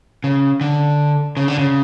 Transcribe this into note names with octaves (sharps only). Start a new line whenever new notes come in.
C#3
D3
C#3
D3
C#3